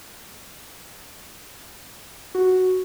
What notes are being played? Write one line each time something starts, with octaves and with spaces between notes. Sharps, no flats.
F#4